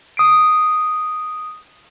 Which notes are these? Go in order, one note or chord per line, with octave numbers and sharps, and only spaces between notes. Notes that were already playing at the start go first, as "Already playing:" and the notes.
D#6 C7 D7